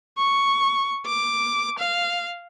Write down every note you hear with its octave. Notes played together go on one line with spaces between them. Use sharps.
C#6
D6
F5